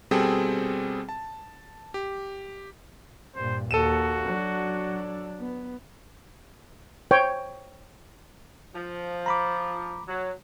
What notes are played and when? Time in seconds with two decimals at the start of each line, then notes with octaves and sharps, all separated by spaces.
0.11 B2 G3 C4 G#4 A4 G5
1.09 A5
1.94 G4
3.36 G2 A#2 C5
3.71 D#2 F#4 A4 D#7 E7
4.27 F#3 D4
5.39 B3
7.11 C5 C#5 G5
8.75 F3
9.26 A#5 B5 D6
10.08 F#3